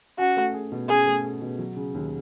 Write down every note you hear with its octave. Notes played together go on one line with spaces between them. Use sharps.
C#4 F#4
A3
G#4
B2
C#4 G#4
A3
G#4
B2
F#3
C#3
D#2